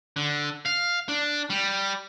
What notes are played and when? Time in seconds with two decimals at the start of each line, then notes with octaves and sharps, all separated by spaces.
0.16 D3
0.66 F5
1.09 D4
1.50 G3